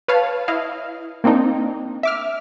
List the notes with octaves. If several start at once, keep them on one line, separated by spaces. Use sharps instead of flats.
B4 C#5 F5 A5
E4 D#5 F5
A#3 C4 D4 D#4
E5 D6 F6